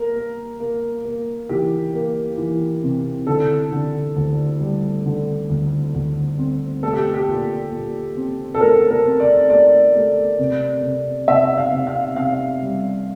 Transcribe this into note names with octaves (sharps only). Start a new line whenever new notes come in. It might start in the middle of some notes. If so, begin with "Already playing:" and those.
Already playing: A#3 A#4
A#3
A#3
A#3
E3 G4
A#3
E3
C3
D3 A4
D3
D2
G3
D3
D2
D2
C4
A3 A4
G4
G4
A#2
A#2
C4
A4
A3 A#4
A#4
C4
D5
A3 D5
A3
C3
C3
C3 E5
F5
C3
F5
C3 F5
G3